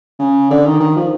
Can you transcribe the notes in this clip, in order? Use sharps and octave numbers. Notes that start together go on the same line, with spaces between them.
C#3
D3
D#3
D#3
F3